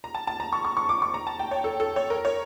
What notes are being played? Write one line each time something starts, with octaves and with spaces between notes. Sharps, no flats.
A#5
A5
A5
A#5
C#6
C#6
C#6
D6
C#6
A#5
A5
G5
C#5
A4
A4
C#5
A#4
C#5